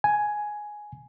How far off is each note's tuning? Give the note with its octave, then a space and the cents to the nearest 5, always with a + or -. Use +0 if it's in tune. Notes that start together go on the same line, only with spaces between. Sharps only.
G#5 +10